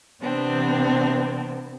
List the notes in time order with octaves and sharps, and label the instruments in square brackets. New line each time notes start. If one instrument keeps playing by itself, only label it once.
[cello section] C3 E3 B3 [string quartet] C4 D4